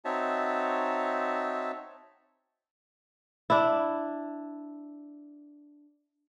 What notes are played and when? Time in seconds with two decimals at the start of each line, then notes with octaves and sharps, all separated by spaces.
0.05 C4 D#4 F#4 C#5 E5 A5
3.50 D4 E4